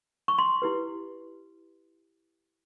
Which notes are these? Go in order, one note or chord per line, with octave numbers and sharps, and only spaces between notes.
C#6
C6
E4 G4 B4